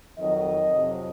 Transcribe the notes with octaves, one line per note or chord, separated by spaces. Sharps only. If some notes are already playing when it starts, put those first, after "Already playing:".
F2 D#3 F#3 D#5
F2 C3 F#3